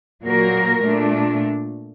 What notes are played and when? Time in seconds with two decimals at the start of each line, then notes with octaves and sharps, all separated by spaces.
0.23 A#2 F#3 A#3 F#4 A#4
0.83 A#2 A3 D4